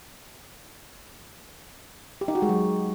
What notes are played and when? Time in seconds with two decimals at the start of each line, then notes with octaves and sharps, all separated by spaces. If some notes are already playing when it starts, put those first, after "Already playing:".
2.21 G4
2.28 D#4
2.35 F#4
2.42 G#3
2.49 F#3